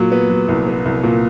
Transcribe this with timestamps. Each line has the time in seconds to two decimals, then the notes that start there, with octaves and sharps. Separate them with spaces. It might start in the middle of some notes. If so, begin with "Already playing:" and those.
Already playing: A#2 F#3
0.12 B3
0.30 F#3
0.48 C2
0.67 B3
0.85 C2
1.03 A#2